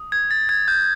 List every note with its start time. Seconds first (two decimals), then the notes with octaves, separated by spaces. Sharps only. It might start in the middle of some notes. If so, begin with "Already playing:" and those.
Already playing: D#6
0.12 G#6
0.31 A6
0.49 G#6
0.68 G6